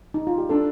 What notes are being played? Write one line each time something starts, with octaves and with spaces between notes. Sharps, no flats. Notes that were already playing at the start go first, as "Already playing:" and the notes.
D#4
F4
G4
D4 A4